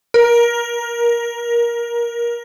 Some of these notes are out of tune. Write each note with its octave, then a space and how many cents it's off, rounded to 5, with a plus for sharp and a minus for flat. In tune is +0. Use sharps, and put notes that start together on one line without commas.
A#4 +20